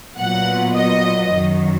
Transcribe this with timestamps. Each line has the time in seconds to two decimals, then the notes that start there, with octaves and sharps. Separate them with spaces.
0.16 A#2 F#3 B3 F#5
0.74 D#5
1.32 F#2 D#3 F#3